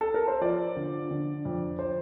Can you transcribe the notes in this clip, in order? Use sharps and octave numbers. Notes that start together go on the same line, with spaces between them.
A4
A#4
C5
F3 D5
D3
D3
F2
C5